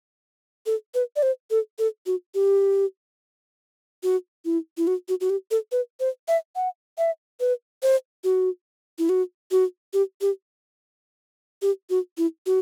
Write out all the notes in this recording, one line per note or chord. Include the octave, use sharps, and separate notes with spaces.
A4
B4
D5
C5
A4
A4
F#4
G4
F#4
E4
E4
F#4
F#4
F#4
G4
A4
B4
C5
E5
F#5
E5
B4
C5
F#4
E4
F#4
F#4
G4
G4
G4
F#4
E4
F#4